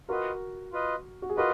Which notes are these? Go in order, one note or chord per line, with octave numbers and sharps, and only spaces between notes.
F4 F#4 A#4 B4 D#5
F4 B4 D#5
F#4
G#4
F4 F#4 A#4 B4 D#5